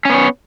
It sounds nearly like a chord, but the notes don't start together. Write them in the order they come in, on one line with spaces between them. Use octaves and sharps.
C#4 B3 C#5